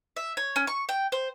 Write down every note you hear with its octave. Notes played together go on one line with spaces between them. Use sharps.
E5
C#5
C#4
C#6
G5
C5